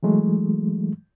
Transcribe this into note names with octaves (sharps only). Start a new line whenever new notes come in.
E3 F#3 G#3 A3